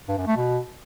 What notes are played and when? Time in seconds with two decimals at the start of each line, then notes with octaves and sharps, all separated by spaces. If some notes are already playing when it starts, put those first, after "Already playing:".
0.08 G2
0.18 F#2
0.27 A3
0.36 B2